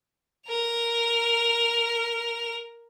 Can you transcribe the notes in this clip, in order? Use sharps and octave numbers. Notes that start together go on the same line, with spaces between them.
A#4 F7